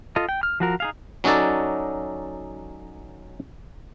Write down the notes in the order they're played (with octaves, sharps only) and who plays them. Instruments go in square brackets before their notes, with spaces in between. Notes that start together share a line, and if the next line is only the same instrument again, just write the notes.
[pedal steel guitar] F4 A4 D#5
G5
F6
F3 F#4 A#4
D#4 G#4 F5
[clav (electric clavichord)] F#3 C#4 D#4 F#4 A4 D5